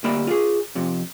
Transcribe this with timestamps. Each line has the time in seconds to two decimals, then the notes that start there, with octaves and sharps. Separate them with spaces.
0.04 D2 G3 A#3 D5 E5 B5
0.27 F4 G#4
0.75 F2 C3